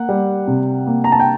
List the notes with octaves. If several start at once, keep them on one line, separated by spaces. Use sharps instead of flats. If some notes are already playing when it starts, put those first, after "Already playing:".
Already playing: A#3 F#5
G3
C3
A#3
A#5
A5
G5